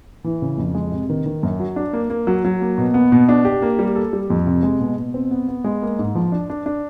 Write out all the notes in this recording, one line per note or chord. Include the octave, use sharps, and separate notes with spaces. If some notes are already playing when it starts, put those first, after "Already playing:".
E3
C#3
F2
G#3
C3
D#3
D#3
F#2
F#3
D4
A#3
A#3
F#3
F#3
A#3
B2
B3
B2
D4
G4
A#3
G3
A4
G3
F2
C3
G#3
B2
B2
C4
B3
B3
G#3
A#3
G#2
F3
D4
D4
D4